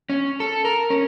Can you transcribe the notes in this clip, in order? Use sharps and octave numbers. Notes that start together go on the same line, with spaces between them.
C#4
A4
A#4
C#4